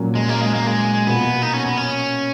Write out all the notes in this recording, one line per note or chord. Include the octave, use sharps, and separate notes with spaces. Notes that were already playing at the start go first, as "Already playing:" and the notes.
Already playing: A#2 F#3 A#3 C#4
G#3
A#3
G#3
A#3
G#3
B2 A#3 B3 F4
D#4
C#4
B3
C#4